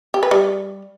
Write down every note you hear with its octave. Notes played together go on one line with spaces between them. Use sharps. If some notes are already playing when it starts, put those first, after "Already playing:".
G4
B4
G3